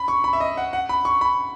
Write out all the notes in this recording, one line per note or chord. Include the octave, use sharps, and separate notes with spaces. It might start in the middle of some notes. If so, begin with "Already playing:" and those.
Already playing: B5
C#6
B5
E5
D#5
F#5
F#5
B5
C#6
B5